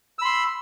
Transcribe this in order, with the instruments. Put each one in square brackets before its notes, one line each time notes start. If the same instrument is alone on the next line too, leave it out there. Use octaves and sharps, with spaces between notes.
[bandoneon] E6
B5
C6